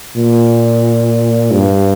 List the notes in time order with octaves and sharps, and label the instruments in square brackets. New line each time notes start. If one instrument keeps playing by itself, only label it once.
[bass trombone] A#2
G2